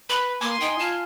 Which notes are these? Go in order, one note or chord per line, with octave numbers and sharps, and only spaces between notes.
B4 B5
A#3 G#5 C6 D6
D#4 G5
F4 A5